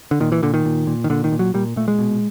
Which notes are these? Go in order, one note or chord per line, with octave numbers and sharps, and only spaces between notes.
D3
A#2 D#3
E3
A#2 D3
D#3
A#2
A#2
D#3
A#2 D3
D#3
A#2
F#3
A#2 G3
A#2 A3
G#3
B2